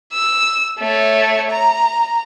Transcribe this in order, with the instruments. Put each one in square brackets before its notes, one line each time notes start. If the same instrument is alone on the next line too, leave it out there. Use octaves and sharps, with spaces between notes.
[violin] E6
A3 C#5
A#5